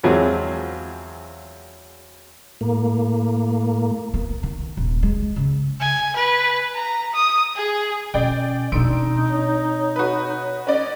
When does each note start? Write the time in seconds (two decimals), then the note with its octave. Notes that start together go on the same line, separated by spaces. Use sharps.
0.04 E2 F3 F#3 G#3 C4 G#5
2.61 A2 A#3
4.14 B3
4.43 D#3
4.77 D#1
5.03 G#3
5.36 C#3
5.80 G#5
6.16 B4
6.75 A#5
7.14 D#6
7.56 G#4
8.14 B2 C#4 D5 G5
8.72 B2 C4 D4 D#4 C6 E6 D7
9.29 C#5
9.96 F#4 B4
10.67 C#4 D5 D#5